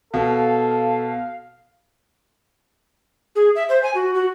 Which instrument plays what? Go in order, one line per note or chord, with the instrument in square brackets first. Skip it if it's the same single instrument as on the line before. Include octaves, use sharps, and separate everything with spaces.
[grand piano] B2 [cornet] A4 [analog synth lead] F5
[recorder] G#4
E5
C5
G#5
F#4
F#4